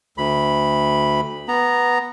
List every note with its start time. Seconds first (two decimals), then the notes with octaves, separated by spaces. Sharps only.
0.18 D2 B5
1.48 B3 A#5